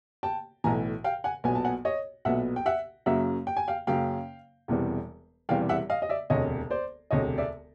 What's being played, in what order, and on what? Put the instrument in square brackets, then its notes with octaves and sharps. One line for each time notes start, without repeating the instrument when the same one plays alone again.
[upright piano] G5 A5
B1 A2 E3 G#5 A#5
F5 G5
F#5 G#5
B1 A#2 F#3 B3 G#5
A5
F#5 G#5
C#5 D#5
B1 A#2 F#3 B3 E5 F#5
G5
E5 F#5
F#2 C#3 F#3 A#3 E5 F#5
G5
G#5
F5 G5
F#2 C#3 F#3 A#3 F5 G5
E1 E2 C3 E3 G3
E1 E2 C3 E3 G3 F5 G5
E5 F#5
D#5 F5
D#5
D5 E5
E1 D2 C3 C#5 D#5
C5 D5
E1 D2 C3 C#5 D#5
D5 E5